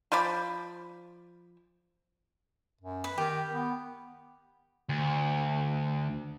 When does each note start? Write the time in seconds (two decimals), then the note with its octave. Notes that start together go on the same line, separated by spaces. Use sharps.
0.12 F3 C5 D5 B5
2.81 F#2
3.04 B4
3.18 D#3 G4
3.53 B3
4.89 D2